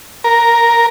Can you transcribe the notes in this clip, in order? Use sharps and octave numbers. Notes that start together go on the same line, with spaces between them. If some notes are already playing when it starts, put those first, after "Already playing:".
A#4